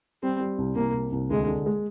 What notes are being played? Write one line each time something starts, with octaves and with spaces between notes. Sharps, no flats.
G3 C4
G3
C2
C2 A#3
C2
C2
D2 G#3
D3
G#3